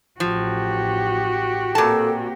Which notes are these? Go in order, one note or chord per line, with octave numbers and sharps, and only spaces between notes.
A1 F3 F#4 G4
A#2 A#3 C4 A4 A5